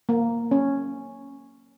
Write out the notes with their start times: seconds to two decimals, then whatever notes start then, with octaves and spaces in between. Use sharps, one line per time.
0.09 A#3
0.51 C#4